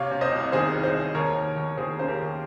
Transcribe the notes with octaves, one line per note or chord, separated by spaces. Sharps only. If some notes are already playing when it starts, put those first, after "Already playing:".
Already playing: C3 C#5 F5
C3
C5 D#5
C2
D#3 G#4 C5
C2
C5 D#5
C2
D#2 A#4 C#5
D#2
D#2
D#2 G#4 C5
C#3 C5
G4 A#4
D#2